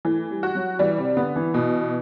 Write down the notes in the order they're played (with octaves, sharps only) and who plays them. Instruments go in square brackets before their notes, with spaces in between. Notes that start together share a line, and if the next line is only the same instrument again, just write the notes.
[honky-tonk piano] E3 [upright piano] A3
[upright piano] G3
[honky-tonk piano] F#4
[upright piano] F#3
[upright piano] E3 [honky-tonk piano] G3
[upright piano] C3
[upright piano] D3 [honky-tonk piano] B3
[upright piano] E3
[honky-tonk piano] B2